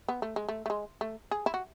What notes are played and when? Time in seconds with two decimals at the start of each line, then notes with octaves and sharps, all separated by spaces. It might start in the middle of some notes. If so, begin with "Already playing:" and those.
0.08 B3
0.22 A3
0.36 G#3
0.49 A3
0.66 A3
0.70 G#3
1.01 A3
1.31 G#4
1.46 E4
1.54 F#4